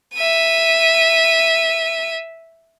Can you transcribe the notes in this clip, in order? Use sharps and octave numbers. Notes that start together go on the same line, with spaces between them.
E5 D#7